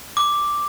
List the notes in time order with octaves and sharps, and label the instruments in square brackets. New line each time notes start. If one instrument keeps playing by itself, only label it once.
[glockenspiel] D6